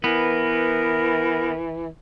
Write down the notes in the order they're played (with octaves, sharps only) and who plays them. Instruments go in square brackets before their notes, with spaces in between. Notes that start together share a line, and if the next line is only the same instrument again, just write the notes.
[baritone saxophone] E3 [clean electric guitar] B3 [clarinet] A#4